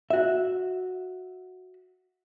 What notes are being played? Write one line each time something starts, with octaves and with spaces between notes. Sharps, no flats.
F#4 E5